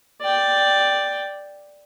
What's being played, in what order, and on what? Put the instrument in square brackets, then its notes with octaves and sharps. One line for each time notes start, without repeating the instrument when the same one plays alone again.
[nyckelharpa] D5 G5